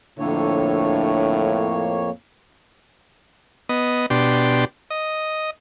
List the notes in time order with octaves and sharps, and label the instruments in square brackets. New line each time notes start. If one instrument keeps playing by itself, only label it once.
[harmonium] F2 A#3 C#5 [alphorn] A2 [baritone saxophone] D3
[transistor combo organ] B3 D#5
B2 D4 G4 C6
D#5